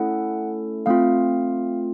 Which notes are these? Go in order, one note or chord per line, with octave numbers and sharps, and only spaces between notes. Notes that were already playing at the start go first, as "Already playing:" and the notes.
Already playing: A3 C#4 E4 A4 F#5
A3 C4 F4 F5